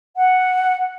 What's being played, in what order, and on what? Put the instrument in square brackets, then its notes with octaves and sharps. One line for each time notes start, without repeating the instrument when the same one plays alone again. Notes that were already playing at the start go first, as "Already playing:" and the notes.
[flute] F#5